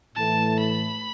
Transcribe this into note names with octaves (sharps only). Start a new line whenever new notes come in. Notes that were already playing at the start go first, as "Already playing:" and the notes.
A2 E3 A3 A5
B5